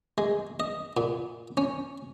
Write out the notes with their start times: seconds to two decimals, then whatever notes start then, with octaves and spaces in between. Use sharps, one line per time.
0.18 G#3
0.60 D#5
0.97 A#2
1.57 C#4